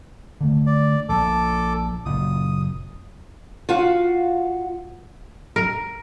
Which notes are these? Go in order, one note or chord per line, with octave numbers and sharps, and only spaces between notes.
D3 A3
D5
A#1 A4 D6
F#1 A#2 D#6
F4 F#4 F5 F#5
A#4